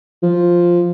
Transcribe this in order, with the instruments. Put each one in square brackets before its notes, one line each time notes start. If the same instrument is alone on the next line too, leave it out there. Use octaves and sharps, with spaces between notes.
[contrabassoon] F3